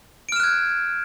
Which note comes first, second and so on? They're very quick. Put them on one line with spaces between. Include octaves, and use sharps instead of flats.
D7 F6 E7 F#6 G#6